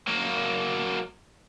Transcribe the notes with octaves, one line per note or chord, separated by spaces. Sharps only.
F#3 A#3